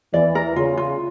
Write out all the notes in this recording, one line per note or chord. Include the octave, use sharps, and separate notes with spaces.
E2 E3 D5
A#4
C#3 F4
F4